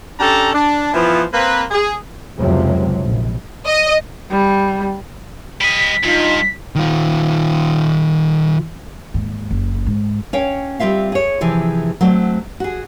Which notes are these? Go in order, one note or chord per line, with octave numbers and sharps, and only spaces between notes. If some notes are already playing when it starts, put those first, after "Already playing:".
C#4 D4 G4 A4 A5 A#5
D4
E3 F3 B3
A#3 C4 B4
G#4
F1 C#2 C3 F3 F#3
A#1
D#5
G3
G3 D#5 B6
G2 D#4 F4
D#3 F4
D#2 G#2
F#1
G#2
C#4 C#5 F5 G5
G3 C4 F4 E5 F5
G#4 C#5
C3 E3 F3 G#4
F#3 A3 C4
F#4 G#4